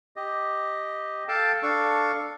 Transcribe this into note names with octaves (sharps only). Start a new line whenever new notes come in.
G4 D#5
A4 F5 G5 A5
D4 A4 F5 C#6